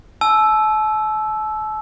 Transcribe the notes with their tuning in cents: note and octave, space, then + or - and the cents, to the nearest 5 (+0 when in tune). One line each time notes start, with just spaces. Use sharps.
A5 -40 E6 +0